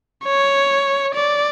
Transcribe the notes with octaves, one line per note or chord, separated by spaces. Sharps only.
C#5
D5